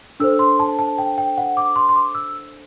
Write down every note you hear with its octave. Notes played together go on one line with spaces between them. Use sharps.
D4 A4 C5 E6
C6
A5
A5
G5
G5
F#5
D6
C6
C6
D6
E6